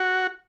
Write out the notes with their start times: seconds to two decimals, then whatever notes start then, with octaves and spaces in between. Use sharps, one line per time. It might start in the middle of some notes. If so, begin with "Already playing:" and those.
Already playing: F#4